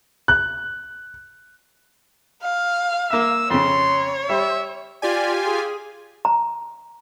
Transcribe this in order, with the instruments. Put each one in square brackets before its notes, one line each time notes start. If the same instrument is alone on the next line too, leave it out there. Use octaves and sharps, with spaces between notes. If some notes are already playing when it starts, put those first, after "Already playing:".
[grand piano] F#6
[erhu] F5
[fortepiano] A#3 E5 [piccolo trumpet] E6
[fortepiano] F2 C#3 [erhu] C#5 [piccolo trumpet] C6
[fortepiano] G3 [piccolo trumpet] E5
[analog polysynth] F4 G4 G#5 [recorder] D5
[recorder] G#4
[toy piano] A#5